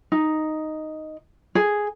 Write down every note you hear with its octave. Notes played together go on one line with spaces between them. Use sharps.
D#4
G#4